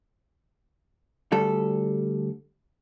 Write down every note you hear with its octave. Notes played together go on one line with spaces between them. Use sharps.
D2 G3 A4